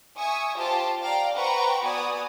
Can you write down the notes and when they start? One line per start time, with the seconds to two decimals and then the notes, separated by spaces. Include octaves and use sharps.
0.17 E5 G#5 C#6 D#6
0.58 F4 G4 C5 A5
1.03 D5 F5 G5 A#5
1.36 B4 C5 F#5 G5 A#5 C#6
1.84 B3 F#4 D5 G#5 D#6